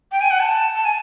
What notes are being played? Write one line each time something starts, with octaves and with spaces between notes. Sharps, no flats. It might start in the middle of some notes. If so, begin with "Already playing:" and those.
G5
G#5
F#5
A5
A5
G#5